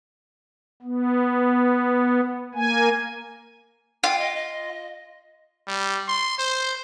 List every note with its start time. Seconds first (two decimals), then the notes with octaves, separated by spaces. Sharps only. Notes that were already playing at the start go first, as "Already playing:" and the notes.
0.82 B3
2.55 A#3 G#5
4.04 F4 G5
4.18 D#5
4.35 D#5
5.68 G3
6.08 C6
6.39 C5